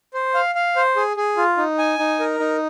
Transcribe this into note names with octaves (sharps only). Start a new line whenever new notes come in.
C5
F5
F5
C5
G#4
G#4
F4
D#4
G#5
D#4
A#4
D#4